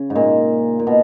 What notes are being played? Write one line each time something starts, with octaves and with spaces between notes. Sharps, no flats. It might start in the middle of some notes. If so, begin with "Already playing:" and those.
Already playing: C#3
G#2
A#2
A#2
B2